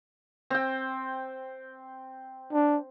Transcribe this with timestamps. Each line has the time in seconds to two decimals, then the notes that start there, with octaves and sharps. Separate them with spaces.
0.50 C4 G5
2.53 D4